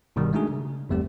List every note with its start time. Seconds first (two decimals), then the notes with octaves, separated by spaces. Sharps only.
0.16 G1 B2 D#3 G3
0.33 G#3 A3 D4 D#4 F#4 G#4
0.50 C#3
0.90 G1 E2 G3 A3 C4 G4